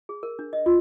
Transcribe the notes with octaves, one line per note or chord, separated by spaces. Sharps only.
G#4
A#4
D4
D#5
F4